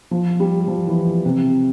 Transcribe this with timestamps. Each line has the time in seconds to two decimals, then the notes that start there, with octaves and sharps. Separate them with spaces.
0.11 F3
0.40 G3
0.68 F3
0.87 E3
1.25 C3